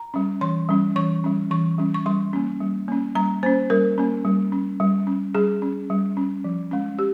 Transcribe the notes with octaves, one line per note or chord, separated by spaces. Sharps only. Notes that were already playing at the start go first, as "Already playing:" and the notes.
Already playing: A#5
G3 C#4
E3 C6
G3 C#4
E3 C#6
G3 C#4
E3 C#6
G3 C#4
C#6
G3 C6
A#3 C#4
G3
A#3 C#4
G3 A#5
A#3 C#4 C5
G3 A#4
A#3 C#4
G3
C#4
G3
C#4
G3 G#4
C#4
G3
C#4
F3
G#3 C#4
G4